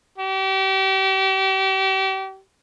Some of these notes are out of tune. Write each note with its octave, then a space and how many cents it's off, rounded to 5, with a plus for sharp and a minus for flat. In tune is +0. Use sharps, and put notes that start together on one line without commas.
G4 -35